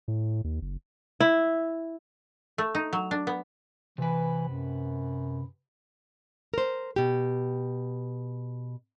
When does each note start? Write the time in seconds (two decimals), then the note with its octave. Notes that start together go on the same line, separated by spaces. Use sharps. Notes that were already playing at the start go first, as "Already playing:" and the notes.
0.08 A2
0.44 D#2
0.62 F#1
1.20 E4
2.58 A3
2.75 D#4
2.93 F#3
3.11 D4
3.27 B3
3.98 C3 E3 B4
4.48 F#2
6.54 A#4 C5
6.96 B2 G4